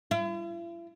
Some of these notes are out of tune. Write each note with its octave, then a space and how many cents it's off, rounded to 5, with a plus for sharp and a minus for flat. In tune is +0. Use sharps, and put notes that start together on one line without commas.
E4 +45